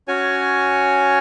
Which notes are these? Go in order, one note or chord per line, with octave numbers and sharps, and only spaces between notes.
C#4 F#4 C#5 G#5